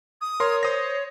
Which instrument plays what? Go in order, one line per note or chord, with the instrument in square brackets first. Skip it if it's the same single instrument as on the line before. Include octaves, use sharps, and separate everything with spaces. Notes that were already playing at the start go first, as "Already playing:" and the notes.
[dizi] D#6
[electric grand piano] A#4 C6 [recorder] C#5
[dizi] C5 [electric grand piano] D#6 A#6